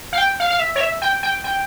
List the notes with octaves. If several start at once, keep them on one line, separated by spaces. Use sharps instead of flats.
F5
G5
F5
F5
E5
C#5
E5
G5
G5
G5